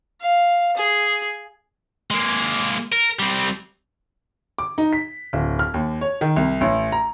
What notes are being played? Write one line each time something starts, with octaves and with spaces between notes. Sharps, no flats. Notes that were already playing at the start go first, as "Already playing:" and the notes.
F5
G#4
G#3 A#3
A#4
G3 C4
D6
D#4
B6
D1
F6
D#2
C#5
D#3
C2
A1
A#5